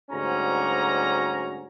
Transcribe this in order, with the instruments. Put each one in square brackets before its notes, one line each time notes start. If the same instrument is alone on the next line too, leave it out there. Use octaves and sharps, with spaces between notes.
[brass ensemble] D2 G#2 G3 C#4 F#4 A#5